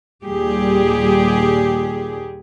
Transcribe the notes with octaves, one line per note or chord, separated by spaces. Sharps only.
D#2 A#2 G3 G4 G#4